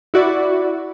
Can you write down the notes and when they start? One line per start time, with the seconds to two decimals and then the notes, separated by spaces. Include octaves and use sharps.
0.14 E4 F#4 D5